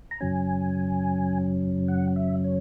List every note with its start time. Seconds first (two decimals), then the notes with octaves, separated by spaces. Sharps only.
0.11 A#5
0.20 F#2 C#3 F#3 C#4 G#5
1.88 F#5
2.16 E5
2.44 C#5